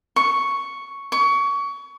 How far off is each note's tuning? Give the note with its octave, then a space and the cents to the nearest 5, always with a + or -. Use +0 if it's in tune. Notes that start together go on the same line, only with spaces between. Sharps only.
C#6 +0
C#6 +25